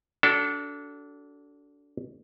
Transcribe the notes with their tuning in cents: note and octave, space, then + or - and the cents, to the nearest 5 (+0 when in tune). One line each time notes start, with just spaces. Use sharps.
D4 -25 F#4 +30 A4 +0